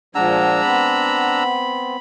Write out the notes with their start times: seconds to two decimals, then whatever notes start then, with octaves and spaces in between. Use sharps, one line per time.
0.15 A#2 F3 G#3 D4 F4 F#5 A#5 E6
0.64 B3 C4 B5